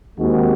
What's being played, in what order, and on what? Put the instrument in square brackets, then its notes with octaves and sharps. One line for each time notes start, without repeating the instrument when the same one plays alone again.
[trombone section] D#2 D#3 G#3 C4 F#4